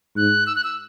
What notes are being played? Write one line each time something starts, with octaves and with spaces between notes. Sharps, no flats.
G#2 F#6
E6
F#6
E6